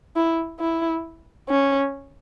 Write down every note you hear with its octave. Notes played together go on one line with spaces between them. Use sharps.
E4
E4
C#4